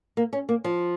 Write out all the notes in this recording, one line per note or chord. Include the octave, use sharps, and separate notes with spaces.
A#3
C#4
A#3
F3